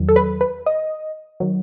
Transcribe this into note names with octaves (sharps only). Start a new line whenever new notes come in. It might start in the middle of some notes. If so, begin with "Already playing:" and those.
Already playing: E2 D#3 F#3
A4
B4
B4
D#5
D#3 F#3